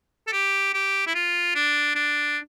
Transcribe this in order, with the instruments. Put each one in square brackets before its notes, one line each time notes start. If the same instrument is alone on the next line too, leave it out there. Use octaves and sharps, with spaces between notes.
[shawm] A4
G4
G4
E4
F4
D4
D4